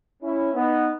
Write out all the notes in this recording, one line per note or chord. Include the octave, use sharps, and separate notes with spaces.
C#4 E4
B3 D#4